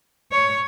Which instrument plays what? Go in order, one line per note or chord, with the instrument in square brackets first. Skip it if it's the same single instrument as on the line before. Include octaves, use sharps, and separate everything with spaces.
[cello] C#5